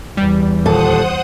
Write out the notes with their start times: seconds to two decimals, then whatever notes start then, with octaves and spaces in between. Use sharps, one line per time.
0.17 E2 G3
0.65 D#2 A#2 A4 C5 F#5 D#6